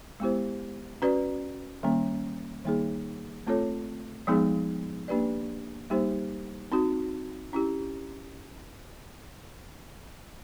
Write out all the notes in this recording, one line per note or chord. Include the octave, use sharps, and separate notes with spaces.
G#3 B3 E4 G4 C5
C#4 F#4 B4 D5
D#3 G3 A#3 C#4
D#3 G3 A#3 D#4 G#4
A3 C4 F4 A4 C#5
F3 G#3 B3 D#4 G#4
A#3 D4 G4 B4 D5
G3 A#3 D#4 G4 C5
C4 D#4 F#4
C#4 E4 G4